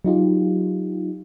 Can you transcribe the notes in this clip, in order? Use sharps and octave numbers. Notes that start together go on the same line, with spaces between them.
F#3 D#4 F4 G4